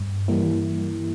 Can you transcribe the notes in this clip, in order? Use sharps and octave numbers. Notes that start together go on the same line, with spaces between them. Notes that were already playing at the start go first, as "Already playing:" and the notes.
Already playing: G2
E3 G3 A#3 E4